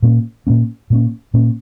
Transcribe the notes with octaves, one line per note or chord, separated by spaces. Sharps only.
A#2 A#3 C#4
A#2 A#3 C#4
A#2 A#3 C#4
A#2 A#3 C#4